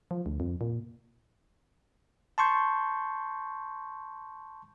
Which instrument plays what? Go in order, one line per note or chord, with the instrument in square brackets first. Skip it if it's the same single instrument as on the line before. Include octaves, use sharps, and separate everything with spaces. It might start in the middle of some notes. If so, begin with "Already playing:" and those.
[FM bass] F3
D2
F2
A#2
[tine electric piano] A5 C6 C#6 G6